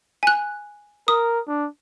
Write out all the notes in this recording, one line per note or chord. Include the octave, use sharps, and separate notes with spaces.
G#5 F#6
A#4 D#6
D4